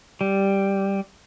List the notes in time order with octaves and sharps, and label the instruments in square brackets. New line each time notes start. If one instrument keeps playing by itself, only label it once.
[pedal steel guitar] G3